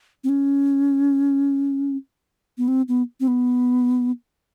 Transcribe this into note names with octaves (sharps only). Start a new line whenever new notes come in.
C4
C#4
B3
C4
B3
C4
B3